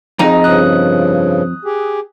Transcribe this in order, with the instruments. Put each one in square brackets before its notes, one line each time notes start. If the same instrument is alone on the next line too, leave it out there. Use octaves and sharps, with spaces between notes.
[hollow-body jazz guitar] F2 D#4 [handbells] G#4 D#5 A#5
[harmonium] G2 C#3 F3 [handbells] D#6 F#6
[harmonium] G4 G#4